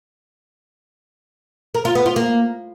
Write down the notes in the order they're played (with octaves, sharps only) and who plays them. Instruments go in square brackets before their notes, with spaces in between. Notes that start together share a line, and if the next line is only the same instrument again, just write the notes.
[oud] A#4
F4
B3
F4
A#3